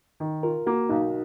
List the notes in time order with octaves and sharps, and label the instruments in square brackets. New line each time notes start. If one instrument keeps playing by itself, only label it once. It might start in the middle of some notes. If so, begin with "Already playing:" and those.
[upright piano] D#3
[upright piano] F4 [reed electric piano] A#4
[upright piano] A#3 [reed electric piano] F#4
[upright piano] B1 [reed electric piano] D#4